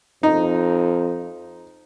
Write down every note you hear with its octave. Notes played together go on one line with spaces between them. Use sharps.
F2 D#4